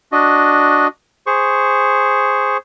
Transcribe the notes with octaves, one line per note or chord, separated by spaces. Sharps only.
D4 F#4 D#5
G#4 C5 C#6